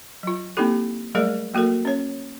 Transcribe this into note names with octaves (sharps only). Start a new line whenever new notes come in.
F#3 F4
A#3 C4 D#4 E4 G4 A4
F#3 G3 A3 G#4 A#4 D5
F#3 A#3 F#4 A4 A#4
C#4 C#5